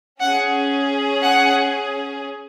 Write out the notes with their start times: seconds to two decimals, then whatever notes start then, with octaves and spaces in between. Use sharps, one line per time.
0.20 C#4 G#4 F#5
1.22 F#5